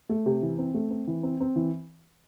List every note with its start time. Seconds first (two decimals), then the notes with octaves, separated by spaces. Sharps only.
0.09 A3
0.26 C3
0.42 E3
0.58 C4
0.74 A3
0.90 C4
1.07 E3
1.23 C4
1.40 C4
1.56 E3